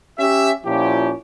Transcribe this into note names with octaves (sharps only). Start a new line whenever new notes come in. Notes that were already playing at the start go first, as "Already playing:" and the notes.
C#4 G4 E5
A#2 F3 C#4 E4 G4